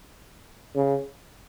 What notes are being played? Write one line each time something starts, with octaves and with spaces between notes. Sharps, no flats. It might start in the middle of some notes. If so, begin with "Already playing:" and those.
C#3